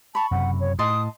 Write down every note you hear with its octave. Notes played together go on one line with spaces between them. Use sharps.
A5 B5 C#6
F#1 F#2 C3 F#5
C#5
A2 D#5 A5 C6 D#6